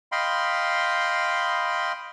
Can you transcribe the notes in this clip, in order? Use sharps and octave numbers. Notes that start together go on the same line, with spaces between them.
D#5 F5 G5 B5 C6